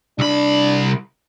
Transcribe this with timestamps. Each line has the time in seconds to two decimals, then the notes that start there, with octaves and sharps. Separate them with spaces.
0.19 C2 D4 B5